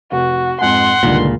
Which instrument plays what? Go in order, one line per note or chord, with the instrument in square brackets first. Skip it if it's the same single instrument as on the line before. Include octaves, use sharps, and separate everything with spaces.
[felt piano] F1 [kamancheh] F#4
[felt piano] F2 G#2 G#5 [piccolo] F#5 [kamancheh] C6
[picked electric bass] C#2 A#2 [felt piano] G2 D3 D#3